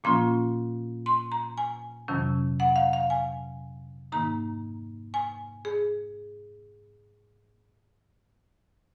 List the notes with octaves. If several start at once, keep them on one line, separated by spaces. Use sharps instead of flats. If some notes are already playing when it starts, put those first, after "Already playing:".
A#2 F3 A#3 C#4 F4 C6
C6
A#5
G#5
F2 C3 D#3 F#3 C#4
F#5
F5
F5
G#5
G#2 D#3 A#3 D#4 A#5
G#5
G#4